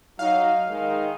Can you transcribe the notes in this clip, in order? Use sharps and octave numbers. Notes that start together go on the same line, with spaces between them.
F#3 D#4 F5
D#3 G#3 D#4